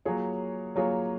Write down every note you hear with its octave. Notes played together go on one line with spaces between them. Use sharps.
F#3 A#3 F4 G#4 C#5
F#3 A#3 F4 G#4 C#5